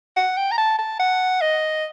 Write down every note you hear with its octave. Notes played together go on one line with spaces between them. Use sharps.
F#5
G5
A#5
A5
A5
F#5
D#5